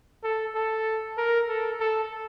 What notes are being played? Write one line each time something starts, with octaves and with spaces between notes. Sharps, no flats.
A4
A4
A#4
A4
A4